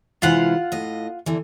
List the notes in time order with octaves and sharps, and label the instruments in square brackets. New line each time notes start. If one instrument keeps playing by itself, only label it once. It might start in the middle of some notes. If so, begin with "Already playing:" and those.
[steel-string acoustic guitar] C3 E3 G#3 [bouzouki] F4 F5 F#5
[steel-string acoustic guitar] A2 D#5
E2 D3 E3